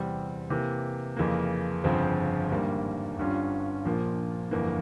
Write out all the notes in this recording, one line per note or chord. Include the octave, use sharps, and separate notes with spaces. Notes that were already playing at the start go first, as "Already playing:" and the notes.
Already playing: E2 C3 G3 C4
C3 E3 A#3
F2 C#3 E3 A#3
G1 F2 C#3 F3 C4
G#1 G2 G3 A#3
G1 G2 G3 C#4 F4
A#1 A#2 F3 A#3
G1 F2 E3 A#3